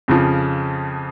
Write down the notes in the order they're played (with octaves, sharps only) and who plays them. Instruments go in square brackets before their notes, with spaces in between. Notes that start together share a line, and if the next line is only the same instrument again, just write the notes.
[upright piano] F2 C#3 F3